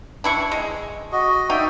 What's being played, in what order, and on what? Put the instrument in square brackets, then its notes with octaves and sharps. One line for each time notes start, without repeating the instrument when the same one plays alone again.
[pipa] D4 E4 C#6
G#3
[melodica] F#4 D#5
[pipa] D#4 [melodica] D5 E5 G5